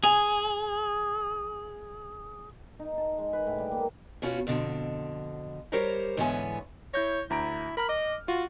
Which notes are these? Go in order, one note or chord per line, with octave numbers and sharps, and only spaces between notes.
G#4 G#5 F7
D#4
A5
G#3
B4
A2
G3
A#3
B2 C#4 F4 F#4
F2 B2 D3
G3 G4 A#4 C5 C#5 A#5
G#2 D3 E3 B3 C#5 G#5
E4 C#5 G6 A#6
D2 E4 A#5 D7
A#4 A#5 B5 F6
D#5 D6
F4 F#4